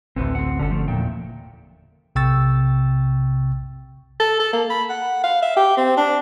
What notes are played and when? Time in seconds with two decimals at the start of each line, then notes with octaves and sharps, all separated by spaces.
0.16 A1 D2 C4 A4 B4
0.35 C4 F#5
0.59 G1 D3 C#4 A4
0.70 F3 A3
0.88 E2 A#2 E5 G5
2.15 B1 C3 G5 C#6 E6 A6
4.20 A4
4.40 A4
4.53 A#3
4.70 B5
4.89 F#5
5.23 F5
5.42 E5
5.56 G4
5.77 C4
5.97 D4